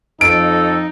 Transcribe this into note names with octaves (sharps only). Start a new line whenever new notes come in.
F2 D#4 A4 D7